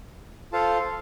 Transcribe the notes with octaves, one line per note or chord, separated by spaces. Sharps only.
F4 A4 C5 F5 A5